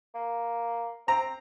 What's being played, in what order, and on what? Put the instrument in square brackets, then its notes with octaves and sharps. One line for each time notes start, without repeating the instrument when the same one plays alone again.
[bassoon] A#3
[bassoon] C4 [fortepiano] A#5